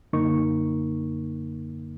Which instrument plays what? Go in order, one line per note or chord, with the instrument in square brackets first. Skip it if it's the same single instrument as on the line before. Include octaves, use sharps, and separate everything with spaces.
[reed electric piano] F#2 D3 A#3 D#4 A#4 C#6